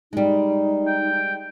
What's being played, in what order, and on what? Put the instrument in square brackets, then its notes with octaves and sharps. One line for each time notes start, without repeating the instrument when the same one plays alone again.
[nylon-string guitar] G3 G#3 [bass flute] D#4
[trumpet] G5